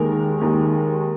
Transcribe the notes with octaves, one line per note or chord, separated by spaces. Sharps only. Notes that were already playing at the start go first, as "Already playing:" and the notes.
Already playing: D#2 D#3 G#3 A#4
D#2 D#3 G#3